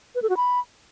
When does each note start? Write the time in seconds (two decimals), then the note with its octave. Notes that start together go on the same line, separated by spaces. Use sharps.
0.15 B4
0.22 A4
0.30 F#4
0.37 B5